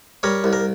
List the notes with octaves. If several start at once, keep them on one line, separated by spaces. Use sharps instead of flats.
G3 A#4 C#5
C2
A#4